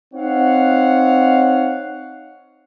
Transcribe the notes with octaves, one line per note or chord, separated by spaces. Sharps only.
C4 D#4 C#5 F5 F#5